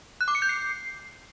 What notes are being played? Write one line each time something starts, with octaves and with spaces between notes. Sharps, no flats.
F#6
D6
C#7
G6
C7